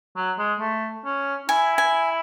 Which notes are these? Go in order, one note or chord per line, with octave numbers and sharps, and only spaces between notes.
F#3
G#3
A3
C#4
E4 G#5
G#5